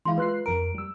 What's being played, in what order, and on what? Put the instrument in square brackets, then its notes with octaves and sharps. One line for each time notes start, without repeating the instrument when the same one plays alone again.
[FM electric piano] E3 G#3 E4 [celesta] F5 C6
[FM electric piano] G#3 F#6 C7 [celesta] F4 B4
[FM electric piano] F2 A#4 [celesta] D7
[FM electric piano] G3 E6